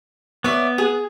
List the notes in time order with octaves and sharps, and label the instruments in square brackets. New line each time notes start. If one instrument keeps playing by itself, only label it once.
[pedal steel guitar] B3 [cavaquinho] C#5 D5 E5
[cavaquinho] G#4